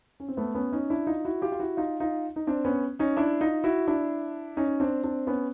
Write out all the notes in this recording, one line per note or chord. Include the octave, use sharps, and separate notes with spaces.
C#4
C4
A3 B3
B3 C#4
C#4 D#4
D4 E4
D#4 F4
E4 F#4
F4 G4
F4
E4 F#4
D#4 F4
D#4 F4
D#4
C4 D4
B3 C#4
C#4 D#4
D4 E4
D#4 F4
E4 F#4
D4 E4
C#4 D#4
C4 D4
C4 D4
B3 C#4